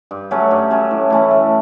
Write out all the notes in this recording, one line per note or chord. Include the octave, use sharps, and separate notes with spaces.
G2
F#3 A3 C#4
G2
F#3 A3 C#4
A2
E3 A3 C#4
A2